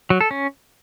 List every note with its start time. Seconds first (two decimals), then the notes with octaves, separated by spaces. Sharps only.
0.10 F#3
0.21 A4
0.31 C#4